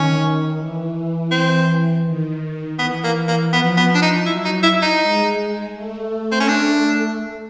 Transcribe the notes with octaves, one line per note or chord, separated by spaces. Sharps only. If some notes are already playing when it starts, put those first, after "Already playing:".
Already playing: D#3 C#4
E3
C4
D#3
E3 B3
A#3
A#3
F3 B3
B3
D4
D#4
F#3 E4
D#4
E4
D#4
G#3
A3
C4
C#4
D4